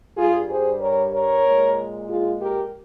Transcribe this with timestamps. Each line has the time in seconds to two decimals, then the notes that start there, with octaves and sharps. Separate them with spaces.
0.17 G2 G3 F4 G#4
0.49 G#4 C5
0.80 A#4 C#5
1.13 A#4 C#5
1.45 A#2 G#3
2.08 F4 G#4
2.40 G4 A#4